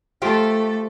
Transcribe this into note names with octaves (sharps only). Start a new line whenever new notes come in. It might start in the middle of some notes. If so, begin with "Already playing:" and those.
A3 F4 G4 A4 C5